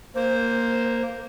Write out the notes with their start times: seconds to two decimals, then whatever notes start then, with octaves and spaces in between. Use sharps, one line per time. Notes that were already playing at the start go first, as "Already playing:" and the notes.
0.15 A#3 C5